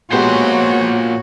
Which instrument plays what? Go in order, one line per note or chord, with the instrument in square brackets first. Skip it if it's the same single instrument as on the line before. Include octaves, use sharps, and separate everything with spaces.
[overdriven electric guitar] A#2 C5 [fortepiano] G#3 B3 G4 [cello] F#4 C#5